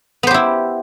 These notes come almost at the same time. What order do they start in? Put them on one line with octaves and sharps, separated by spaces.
B3 C5 G4 E4